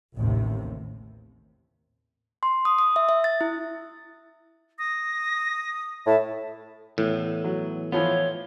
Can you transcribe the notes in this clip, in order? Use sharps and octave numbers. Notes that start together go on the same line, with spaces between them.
A1 D#2 C3
C6
D#6
D#6
E5
E5
A6
E4
D#6 A#6
A2 E5 A5
A2 E3 B3
F#3
E3 F3 B3 F4 C#5